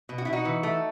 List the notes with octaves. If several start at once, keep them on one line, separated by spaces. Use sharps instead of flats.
B2
F#4
B2 E4
D#4 F#4
E3
A3